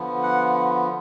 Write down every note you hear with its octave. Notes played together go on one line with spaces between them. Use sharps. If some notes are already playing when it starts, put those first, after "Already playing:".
Already playing: D3 F3 B3
F#5